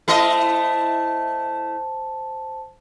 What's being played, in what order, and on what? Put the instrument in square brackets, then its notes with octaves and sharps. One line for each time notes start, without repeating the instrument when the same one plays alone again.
[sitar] A3 E4 D#5 [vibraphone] C5 A5